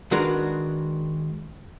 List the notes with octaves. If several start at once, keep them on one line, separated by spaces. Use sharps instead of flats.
D#3 G#3 D4 F#4 A#4 B4